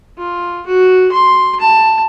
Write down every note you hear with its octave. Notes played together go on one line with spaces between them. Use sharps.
F4
F#4
C6
A5